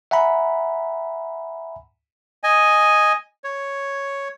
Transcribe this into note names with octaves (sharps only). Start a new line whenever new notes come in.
E5 F#5 G#5 A#5 B5
D#5 G#5
C#5